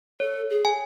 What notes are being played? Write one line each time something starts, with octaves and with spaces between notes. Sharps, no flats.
A4 C#5
G#4
G#5